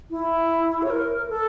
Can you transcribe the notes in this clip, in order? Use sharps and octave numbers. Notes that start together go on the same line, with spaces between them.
E4
C#5
A#4
A4